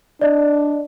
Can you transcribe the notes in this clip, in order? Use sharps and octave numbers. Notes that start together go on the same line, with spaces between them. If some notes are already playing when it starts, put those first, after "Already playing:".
D4 D5 D#5